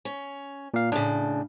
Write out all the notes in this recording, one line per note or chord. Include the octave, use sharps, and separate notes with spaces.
C#4
A#2 F5
A2 C#3 D4